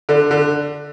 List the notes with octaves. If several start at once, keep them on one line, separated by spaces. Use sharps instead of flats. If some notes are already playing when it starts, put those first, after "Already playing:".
D3
D3